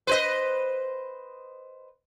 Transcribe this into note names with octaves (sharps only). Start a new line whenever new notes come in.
B4 C5 D#5